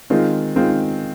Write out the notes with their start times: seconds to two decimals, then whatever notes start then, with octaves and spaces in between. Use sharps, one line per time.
0.10 D#3 G#3 C4 F4
0.56 D#3 G#3 C4 F4